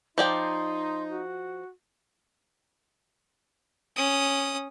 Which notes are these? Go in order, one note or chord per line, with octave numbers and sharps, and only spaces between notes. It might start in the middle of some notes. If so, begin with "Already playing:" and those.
F3 D#4 D5 G5 C6
F#4
C#4 D#6